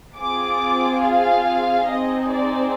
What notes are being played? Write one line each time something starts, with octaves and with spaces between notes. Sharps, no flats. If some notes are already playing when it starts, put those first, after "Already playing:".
C4 F4 G#4 D6
F5
C4 D#4 G#4 D#5
D5